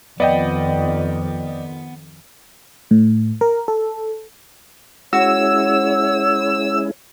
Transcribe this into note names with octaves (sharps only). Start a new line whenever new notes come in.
F2 D#3 B3 D5 D#5 G5
A2
A#4
A4
G#3 C#4 E4 F#4 C#5 E6